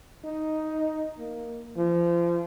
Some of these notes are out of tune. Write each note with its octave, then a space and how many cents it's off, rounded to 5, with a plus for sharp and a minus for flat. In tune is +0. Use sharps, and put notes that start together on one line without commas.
D#4 +5
A#3 +5
F3 -30